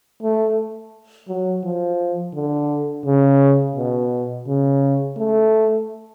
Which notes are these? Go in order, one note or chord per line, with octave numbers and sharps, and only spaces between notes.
A3
F#3
F3
D3
C#3
B2
C#3
A3